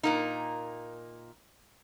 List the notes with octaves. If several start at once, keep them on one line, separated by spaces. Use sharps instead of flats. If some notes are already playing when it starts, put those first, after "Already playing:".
A#2 A#3 D#4